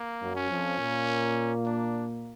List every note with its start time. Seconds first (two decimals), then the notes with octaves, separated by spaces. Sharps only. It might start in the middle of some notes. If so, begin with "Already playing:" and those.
Already playing: A#3
0.21 F#2 F#3
0.36 C#4
0.50 F2 F3
0.79 A#2 A#3
1.66 D4